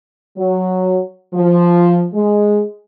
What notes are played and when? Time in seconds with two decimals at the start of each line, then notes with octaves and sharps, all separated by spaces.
0.37 F#3
1.34 F3
2.14 G#3